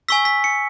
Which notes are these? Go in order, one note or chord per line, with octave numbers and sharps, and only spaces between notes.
G#5 C#6 E6 B6
B6
C#7